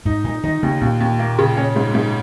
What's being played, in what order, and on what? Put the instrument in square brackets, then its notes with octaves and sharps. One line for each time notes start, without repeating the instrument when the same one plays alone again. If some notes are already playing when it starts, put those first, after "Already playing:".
[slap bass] G#2 [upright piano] D#4
[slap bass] A#2 [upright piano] D#4
[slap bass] D#3 [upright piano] D#4
[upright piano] D#2 [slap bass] C#3
[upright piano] D#2 [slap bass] A#2
[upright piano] D#2
A#3
C#3
C#4
G#2
G#2